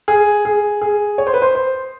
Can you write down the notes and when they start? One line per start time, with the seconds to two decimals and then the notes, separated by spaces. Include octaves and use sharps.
0.08 G#4
0.45 G#4
0.82 G#4
1.18 C#5
1.27 C5
1.34 B4
1.42 C5
1.55 C5